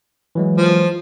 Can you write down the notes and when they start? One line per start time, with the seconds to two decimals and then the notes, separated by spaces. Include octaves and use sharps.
0.35 E3 F#3 G#3
0.57 F3